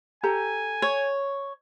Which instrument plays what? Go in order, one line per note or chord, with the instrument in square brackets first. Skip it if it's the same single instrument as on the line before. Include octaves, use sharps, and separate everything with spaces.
[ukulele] G4 A4 A#5 [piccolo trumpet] G#5
[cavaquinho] C#5